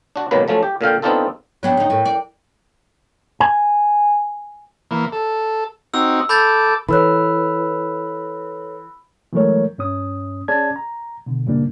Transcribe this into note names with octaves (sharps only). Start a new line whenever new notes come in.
D4 F#4
G#1 B2 D#3 F#3 A#3 B4
F3 F#3 A3 C#4
G4
A#2 D3 F5 G5
B3 C4 D4 D#4 F4 A4
F#3 B3 D4 C#5 G5
D2 D#4
A2 E4 A#4 G5
D5
G#5
E3 A#3
A4
C4 D#4 F#4 E6
A4 B5 D6 G6 A6
E3 A4 B4 C#5 B5 E6 F#6
E3 F#3 G#3 A3 A#4 C#5
G2 C#4 D#6
C#4 G#4 D5 A5 G#6
A#5
B2 D3
F#2 A#2 C#3 G3 A#3 D4